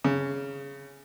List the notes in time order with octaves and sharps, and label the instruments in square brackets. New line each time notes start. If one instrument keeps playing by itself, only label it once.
[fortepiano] C#3